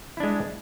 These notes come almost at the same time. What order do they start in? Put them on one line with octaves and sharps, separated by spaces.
E4 D4 G#3